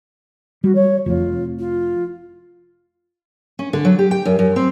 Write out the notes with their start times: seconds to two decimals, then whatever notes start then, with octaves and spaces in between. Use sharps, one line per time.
0.64 G3 F#4
0.75 C#5
1.06 F1 F2 F4
1.59 F4
3.59 C#4
3.73 D3
3.85 F#3
3.99 G4
4.11 G5
4.25 F#2
4.39 F#2
4.56 C4